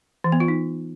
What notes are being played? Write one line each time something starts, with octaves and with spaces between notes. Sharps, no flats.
E3
B3
F4
D#4